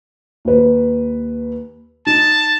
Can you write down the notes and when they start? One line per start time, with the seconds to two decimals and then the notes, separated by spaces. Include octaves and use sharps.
0.45 D#2 B4
2.07 D#4 A5